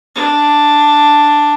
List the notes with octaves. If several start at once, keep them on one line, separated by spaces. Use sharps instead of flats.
D4